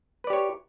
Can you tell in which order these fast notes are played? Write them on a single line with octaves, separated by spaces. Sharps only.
B4 D5 G4 C#5